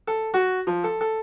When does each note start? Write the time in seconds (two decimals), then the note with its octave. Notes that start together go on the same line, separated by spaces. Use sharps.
0.07 A4
0.34 F#4
0.67 F3
0.84 A4
1.01 A4